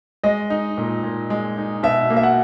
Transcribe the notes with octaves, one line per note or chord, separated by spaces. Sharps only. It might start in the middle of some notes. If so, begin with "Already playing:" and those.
G#3 D#5
D#4
A#2
A#2
G#3
D#4
B2 E5
A#3
E5
F#5